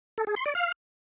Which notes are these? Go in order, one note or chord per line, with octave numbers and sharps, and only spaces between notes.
A4
G#4
C6
D5
F5